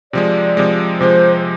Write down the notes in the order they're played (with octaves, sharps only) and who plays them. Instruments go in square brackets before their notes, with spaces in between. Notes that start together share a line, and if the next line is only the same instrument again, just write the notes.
[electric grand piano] C3 F3 G#3 [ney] D5
[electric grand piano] C3 F3 G#3
[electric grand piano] C3 F3 G#3 [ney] C5